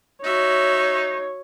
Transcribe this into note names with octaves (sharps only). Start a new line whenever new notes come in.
D#4 F#4 C#5 E5